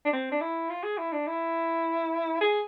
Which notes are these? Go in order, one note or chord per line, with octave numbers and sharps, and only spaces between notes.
D4
C4
D4
E4
F4
G#4
E4
D4
E4
G#4